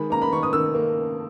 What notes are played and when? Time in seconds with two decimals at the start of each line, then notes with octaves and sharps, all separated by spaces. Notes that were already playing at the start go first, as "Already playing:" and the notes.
Already playing: D#3 G#3 B5
0.10 A#3 A#5
0.22 B5
0.31 D#3 C#6
0.43 D#6
0.53 D#3 E6
0.75 A#3